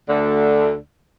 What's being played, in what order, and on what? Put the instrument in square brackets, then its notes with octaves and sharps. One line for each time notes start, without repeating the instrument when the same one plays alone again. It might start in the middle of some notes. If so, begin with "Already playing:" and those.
[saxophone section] D2 D3